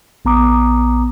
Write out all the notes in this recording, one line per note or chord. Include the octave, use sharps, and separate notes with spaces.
A#1 B3 A#5 D6 D#6